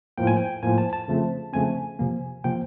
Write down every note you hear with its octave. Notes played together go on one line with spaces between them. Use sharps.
A2 F3 A#3 G5
G#5
G5
A2 F3 A#3 G#5
A5
A5
C#3 F3 A3 C4
C#3 F3 A3 C4 G#5
C3 F3 A#3
C3 F3 A#3 G5